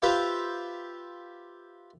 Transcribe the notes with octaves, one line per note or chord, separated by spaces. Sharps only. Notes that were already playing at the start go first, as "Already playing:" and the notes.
F4 G4 B4 C5 E5 F5